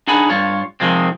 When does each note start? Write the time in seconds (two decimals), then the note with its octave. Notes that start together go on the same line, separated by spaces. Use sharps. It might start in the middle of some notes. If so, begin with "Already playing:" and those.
0.07 D4 D#4 G#4 F#5 G#5 B5
0.29 G2 F4 C#5
0.80 C3 D#3 F3 G#3 C4